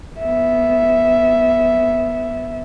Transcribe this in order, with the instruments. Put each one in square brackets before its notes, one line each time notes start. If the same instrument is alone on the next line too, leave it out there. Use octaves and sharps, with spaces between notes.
[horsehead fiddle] B3 E5